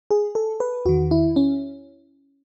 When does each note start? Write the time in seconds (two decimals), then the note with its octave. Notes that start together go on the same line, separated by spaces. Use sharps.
0.11 G#4
0.35 A4
0.60 B4
0.85 E2 D#3 F#4
1.11 E4
1.36 C#4